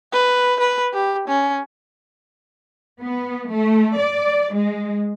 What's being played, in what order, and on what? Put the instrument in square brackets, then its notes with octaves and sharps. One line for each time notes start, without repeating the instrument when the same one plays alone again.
[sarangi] B4
B4
G4
C#4
[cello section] B3
A3
D5
G#3